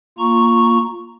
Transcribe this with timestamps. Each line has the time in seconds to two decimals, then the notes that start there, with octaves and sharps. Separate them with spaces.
0.18 A#3 F4 A#5 C#6